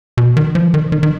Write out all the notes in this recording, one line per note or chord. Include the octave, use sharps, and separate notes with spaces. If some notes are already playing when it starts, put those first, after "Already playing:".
B2
D#3
F3
D#3
D#3
D#3